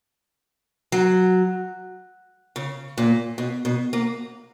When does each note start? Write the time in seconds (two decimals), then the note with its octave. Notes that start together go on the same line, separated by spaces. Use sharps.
0.92 F#3
2.56 C#3
2.98 A#2
3.38 B2
3.65 B2
3.93 A#3